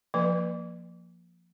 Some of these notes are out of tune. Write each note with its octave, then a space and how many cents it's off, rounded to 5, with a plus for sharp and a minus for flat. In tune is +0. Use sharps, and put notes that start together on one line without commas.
F3 +0 A#3 +0 B4 -10